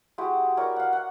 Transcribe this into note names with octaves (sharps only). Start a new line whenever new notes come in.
G#3 E4 F#4 G4
E4 A#4 C#5 D5
F5 F#5
F#5